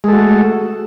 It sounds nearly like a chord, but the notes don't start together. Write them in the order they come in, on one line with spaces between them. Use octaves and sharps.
G#3 A4 F#4 A3